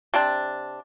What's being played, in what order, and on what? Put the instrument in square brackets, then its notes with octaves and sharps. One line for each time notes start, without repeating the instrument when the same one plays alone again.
[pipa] C3 C4 D4